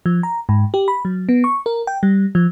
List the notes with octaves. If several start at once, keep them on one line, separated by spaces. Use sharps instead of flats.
F3
A#5
G#2
G4
B5
F#3
B3
C#6
A#4
G5
G3
F3